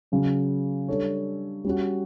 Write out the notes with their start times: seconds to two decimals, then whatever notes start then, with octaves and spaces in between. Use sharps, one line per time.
0.12 C#3 F#3 C#4
0.88 G3 D4 A4 C#5
1.65 G3 C#4 F#4